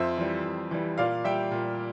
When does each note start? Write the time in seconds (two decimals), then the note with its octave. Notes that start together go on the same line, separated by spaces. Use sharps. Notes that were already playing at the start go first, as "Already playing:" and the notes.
Already playing: F2 C5 E5
0.18 E3 G3
0.44 F2
0.71 E3 G3
0.98 A#2 D5 F5
1.24 G3 E5 G5
1.51 A#2